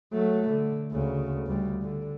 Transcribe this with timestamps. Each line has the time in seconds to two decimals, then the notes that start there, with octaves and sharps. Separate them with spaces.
0.13 F#3 A3
0.49 D3
0.91 D2 C#3
1.46 D2 G3
1.82 D3